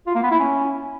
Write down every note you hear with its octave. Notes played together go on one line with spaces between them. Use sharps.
F4
A#3
B3
E4
C#4